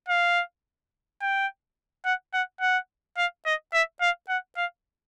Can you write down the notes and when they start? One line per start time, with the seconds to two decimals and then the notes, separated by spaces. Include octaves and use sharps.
0.08 F5
1.21 G5
2.05 F#5
2.34 F#5
2.61 F#5
3.17 F5
3.46 D#5
3.73 E5
4.01 F5
4.29 F#5
4.57 F5